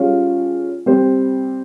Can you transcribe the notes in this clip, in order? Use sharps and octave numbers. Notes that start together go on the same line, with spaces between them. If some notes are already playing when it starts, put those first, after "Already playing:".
Already playing: G3 C#4 F4 G#4 C#5
G3 C4 G4 C5